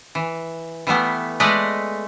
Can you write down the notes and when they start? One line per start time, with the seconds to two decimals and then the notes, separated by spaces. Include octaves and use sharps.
0.15 E3
0.87 E3 G3 A3 B3
1.40 G#3 A3 B4 D5 D#5